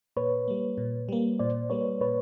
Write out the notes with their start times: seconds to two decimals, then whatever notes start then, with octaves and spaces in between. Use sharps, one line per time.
0.16 A#2 B4 C#5
0.48 G3 A#3
0.78 A#2
1.09 G3 A#3
1.39 A#2 C5 D5
1.70 G3 A#3 B4 C#5
2.01 A#2 B4 C#5